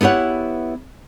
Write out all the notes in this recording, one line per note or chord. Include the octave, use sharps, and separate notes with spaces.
B3 E4 G4 C#5 F#5